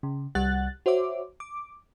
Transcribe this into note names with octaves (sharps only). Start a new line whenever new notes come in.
C#3
C2 G3 F#5 F#6 A6
F#4 C5 C#5 E5 D6
D6